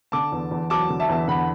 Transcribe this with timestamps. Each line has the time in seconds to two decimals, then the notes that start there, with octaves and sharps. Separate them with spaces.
0.12 D3 A5 D6
0.32 E2
0.51 E2
0.70 F#3 A5 D6
0.90 D3
1.00 E5 A5
1.09 E2
1.28 D3 F#5 B5